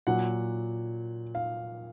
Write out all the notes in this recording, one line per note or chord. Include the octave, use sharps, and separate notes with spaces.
A#2 F#3 F#5
F5